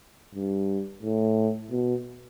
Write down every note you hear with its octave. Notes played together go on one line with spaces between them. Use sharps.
G2
A2
B2